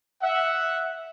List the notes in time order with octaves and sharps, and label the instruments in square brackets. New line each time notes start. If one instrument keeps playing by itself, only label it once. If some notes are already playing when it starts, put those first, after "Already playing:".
[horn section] E5 F#5